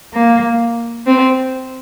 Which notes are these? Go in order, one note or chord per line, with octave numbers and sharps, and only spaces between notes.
A#3
C4